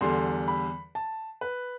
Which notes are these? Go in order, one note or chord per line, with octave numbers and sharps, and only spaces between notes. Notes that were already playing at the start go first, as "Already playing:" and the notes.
E2 D3 G3 C6
B5
A5
B4